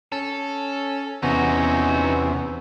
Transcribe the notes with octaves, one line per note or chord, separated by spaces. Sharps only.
C#4 A4
E2 C3 B3 C#4 D#4 F#4